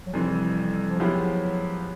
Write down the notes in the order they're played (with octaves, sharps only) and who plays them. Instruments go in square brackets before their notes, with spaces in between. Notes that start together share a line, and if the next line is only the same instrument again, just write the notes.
[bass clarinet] F#3
[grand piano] F2 C3 E3 [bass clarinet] G3
[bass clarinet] F3
[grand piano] F3 G#3 B3 E4 G4 [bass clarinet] F#3